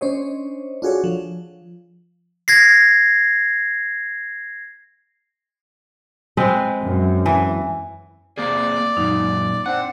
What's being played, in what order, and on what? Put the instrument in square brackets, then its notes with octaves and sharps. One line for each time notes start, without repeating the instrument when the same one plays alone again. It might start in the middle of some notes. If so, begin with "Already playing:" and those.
[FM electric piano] C#4 D4 C5 C#5 D#5
D4 F4 F#4 G#4 A4 C#5
F3
[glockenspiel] G#6 A#6 C7
[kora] G#3 C4 B4
[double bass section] F#2
[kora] E3
[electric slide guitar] A#3 C4 G#4 [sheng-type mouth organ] D5
[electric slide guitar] F#2 A#2 [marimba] D#4
[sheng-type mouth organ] C4 D4 [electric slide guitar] F#5 [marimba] F#6